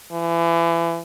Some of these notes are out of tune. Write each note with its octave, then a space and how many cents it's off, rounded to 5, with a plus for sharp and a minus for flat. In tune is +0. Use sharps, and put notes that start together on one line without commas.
E3 +30